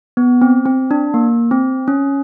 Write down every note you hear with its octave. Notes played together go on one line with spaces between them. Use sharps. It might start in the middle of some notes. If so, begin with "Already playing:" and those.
B3
C4
C4
D4
A#3
C4
C#4